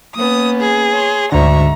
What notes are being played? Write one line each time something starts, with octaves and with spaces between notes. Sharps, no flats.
A#3 B3 C#4 D#6
G#4
C#5 C6
D2 G#2 D3 E5 A#5 C#6